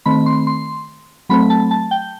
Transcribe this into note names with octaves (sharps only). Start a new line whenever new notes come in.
D#3 A3 C4 B5
C6
C6
F#3 A3 C4 B5
A5
A5
G5